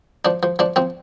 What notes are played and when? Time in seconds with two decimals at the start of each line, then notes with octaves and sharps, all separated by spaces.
0.25 F3 D4
0.43 F3
0.59 F3 D4
0.76 F3 C4